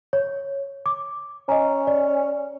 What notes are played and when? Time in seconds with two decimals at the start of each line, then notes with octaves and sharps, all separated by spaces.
0.13 C#5
0.86 D6
1.49 C#4 D#5 G#5 A#5
1.87 D5